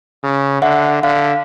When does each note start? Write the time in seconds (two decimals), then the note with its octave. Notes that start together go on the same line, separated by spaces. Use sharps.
0.23 C#3
0.62 D3 E5 F#5
1.03 D3 F5